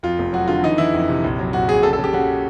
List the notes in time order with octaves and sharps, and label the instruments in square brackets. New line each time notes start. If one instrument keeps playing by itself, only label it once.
[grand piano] F2 F4
F1
F#3 F#4
D3 F4
E3 D#4
E3 E4
F2
C3
A#1
F#3
A#1 F#4
A#1 G#4
C#3 A4
A4
C#3
G4
C#3 F#4